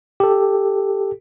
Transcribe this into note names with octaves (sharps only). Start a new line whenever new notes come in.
G4 A4